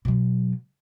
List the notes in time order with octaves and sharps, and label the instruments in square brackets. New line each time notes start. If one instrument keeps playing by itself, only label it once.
[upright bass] B2 F#3